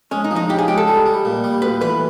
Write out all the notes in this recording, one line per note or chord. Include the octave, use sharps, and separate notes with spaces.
G#3 C#4
D#4
F3
D#4
C#3 G4
G#4
G#3 G4
A4
G3
G3
A#2
G3
D2 B4
E3 B4